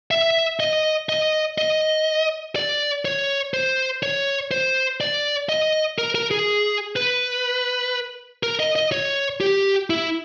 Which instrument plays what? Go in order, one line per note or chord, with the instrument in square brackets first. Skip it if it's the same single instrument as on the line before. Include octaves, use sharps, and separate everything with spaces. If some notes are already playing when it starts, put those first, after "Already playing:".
[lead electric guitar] E5
D#5
D#5
D#5
D5
C#5
C5
C#5
C5
D5
D#5
A#4
A#4
G#4
B4
A#4
D#5
D#5
C#5
G4
E4